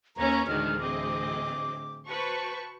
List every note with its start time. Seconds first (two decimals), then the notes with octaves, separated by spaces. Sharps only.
0.17 D#2 C#4 B4 C#5 A#5
0.47 D2 A2 D#3 E3 G#3 D4 F6
0.80 C4 G#4 D#5 D6
2.07 F#4 B4 C5 A5 C#6